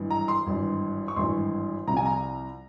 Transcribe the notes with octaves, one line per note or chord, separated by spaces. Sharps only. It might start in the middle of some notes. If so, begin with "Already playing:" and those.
Already playing: G#1 G2 E3
A#5
C6
G#1 G2 E3
C#6
G#1 G2 E3 C6
C2 C3 F3 A#5
G#5
A#5